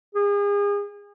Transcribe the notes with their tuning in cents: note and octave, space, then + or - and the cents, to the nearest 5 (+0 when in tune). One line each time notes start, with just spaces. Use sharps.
G#4 -35